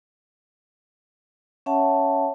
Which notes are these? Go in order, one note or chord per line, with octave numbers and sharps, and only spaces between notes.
C#4 C#5 E5 F#5 A5